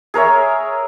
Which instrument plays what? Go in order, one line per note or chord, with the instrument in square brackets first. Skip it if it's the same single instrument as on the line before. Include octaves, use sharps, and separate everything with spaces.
[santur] G#4 A#4 C#5 E5